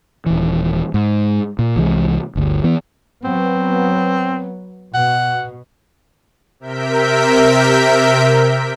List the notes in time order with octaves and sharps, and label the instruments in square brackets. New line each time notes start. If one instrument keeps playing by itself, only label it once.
[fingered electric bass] D#1 E3
G#2
A#2
C2 E3 F3 G#3
G1 D2
E3 B3
[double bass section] F#3 B3 [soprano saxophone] C4
[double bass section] B2 [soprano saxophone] F#5
[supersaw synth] C3 A#4 E5 G6 B6 D7